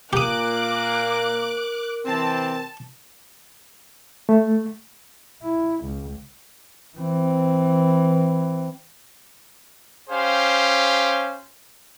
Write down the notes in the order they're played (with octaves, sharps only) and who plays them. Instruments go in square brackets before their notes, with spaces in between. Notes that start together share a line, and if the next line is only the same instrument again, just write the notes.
[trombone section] A#2 A#3 [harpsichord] G4 D#6 [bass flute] A#4 [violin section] D6 F#6
[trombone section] C3 E3 C4 [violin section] A5
[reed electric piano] A3
[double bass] E4
C#2
E3 C4
[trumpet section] C#4 G4 C5 F5